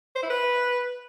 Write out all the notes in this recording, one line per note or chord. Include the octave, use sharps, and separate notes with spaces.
C5
E4
B4